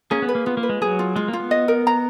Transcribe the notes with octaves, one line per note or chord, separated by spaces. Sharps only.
A#3 C#4 G#4
B3
B4
A#3
B3 F4
A#3
B4
G#3
F#3 G#4
F4
G#3 F4
A#3
F4
B3
D#5
A#4
A#5